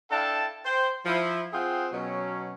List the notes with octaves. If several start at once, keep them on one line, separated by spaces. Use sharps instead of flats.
D4 E4 A4 F5 G5 A5
C5 G5
F3 E4
C4 F4 G#4 C5 F#5 G5
B2 F#3 C#4